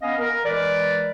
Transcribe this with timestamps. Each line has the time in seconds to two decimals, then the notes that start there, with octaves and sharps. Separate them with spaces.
0.02 B3 C#4 D#5 F5
0.18 A#4
0.45 E3 G#3 A#4 B4 D5